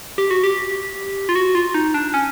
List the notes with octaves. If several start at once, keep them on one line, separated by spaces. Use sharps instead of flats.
G4
F#4
G4
F4
F#4
F4
D#4
D4
C#4